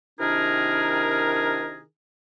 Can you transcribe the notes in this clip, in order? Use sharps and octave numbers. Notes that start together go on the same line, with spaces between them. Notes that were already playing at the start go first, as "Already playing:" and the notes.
C3 D#3 D4 E4 G#4 A#4